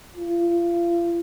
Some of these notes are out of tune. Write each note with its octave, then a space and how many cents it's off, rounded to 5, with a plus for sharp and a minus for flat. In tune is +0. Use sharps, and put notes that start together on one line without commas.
F4 -35